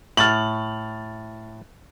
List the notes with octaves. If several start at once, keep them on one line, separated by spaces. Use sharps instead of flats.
A2 F6 A6 F#7